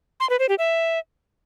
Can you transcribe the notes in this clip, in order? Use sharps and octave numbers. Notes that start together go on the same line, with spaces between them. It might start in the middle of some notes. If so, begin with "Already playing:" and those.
C6
B4
C5
G4
E5